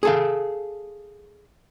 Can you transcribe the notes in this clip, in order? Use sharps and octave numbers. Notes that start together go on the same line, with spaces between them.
G#4 A4 F5